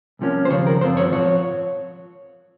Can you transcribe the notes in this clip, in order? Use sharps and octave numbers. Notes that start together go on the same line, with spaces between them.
C2 C3 F3 A#3 C#4
C5
D#2 C#3 F3 C#5
A#4
F#2 F3 C4 C5
C#5
A#2 F3 C#5